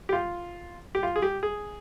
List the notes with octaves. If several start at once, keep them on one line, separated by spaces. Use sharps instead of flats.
G4
F4
G4
F4
G#4
G4
G#4